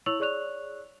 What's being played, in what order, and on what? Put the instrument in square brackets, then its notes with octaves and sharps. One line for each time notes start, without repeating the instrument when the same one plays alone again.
[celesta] E4 C#5 C#6 E6 F7 F#7
G#4 C#5 D5 C#6 F#6 F7